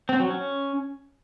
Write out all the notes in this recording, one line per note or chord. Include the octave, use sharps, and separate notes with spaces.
C4
F#3
C#4